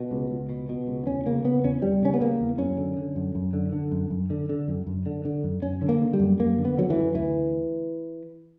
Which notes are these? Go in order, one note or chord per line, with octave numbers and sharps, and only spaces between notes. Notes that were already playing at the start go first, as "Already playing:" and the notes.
Already playing: B2
C#2
C#2
B2
B2
C#2
E2 C#4
C#3 A#3
C#3 B3
E2 C#4
E2 G3
C#3 C#4
B3
C#3 A#3
E2
F#2 C#4
D3
D3
F#2
F#2
D3
D3
F#2
F#2
D3
D3
F#2
F#2
D3
D3
F#2
F#2 C#4
D3
A#3
D3
G3
F#2
F#2 A#3
D3
B3
D3 F#3
E3
F#2
D2 E3